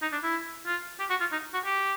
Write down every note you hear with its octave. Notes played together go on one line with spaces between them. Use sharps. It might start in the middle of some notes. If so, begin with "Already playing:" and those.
D#4
D4
E4
F4
G4
F#4
F4
D#4
F#4
G4